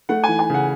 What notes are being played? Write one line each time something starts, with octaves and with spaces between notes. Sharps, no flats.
A3 F#5
E3 G#5
G#5
C#3 F#5